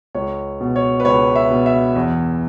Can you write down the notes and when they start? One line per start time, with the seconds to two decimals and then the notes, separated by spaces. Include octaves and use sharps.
0.15 C#2 C#5
0.61 B2
0.76 C#5
1.00 B4
1.05 C#2 C#5
1.35 E5
1.50 B2
1.66 E5
1.95 E2